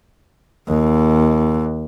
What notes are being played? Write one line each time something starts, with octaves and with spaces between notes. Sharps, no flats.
D#2